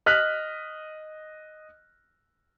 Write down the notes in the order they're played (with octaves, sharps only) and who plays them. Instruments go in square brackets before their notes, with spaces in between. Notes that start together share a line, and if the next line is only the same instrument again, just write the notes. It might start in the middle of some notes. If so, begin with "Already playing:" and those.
[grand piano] D#5 F6 F#6 B6